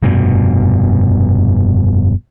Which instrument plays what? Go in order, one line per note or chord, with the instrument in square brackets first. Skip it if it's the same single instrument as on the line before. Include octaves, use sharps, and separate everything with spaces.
[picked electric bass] F1 G2 B2